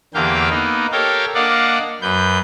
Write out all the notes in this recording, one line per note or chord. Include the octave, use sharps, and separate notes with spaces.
E2 D3 A#3 G4 F5 G5
A#3 B3 D#4
G4 A4 A#4 C#5 F5 G5
A#3 D4 D5 D#5 F5 F#5
F#2 B4 G6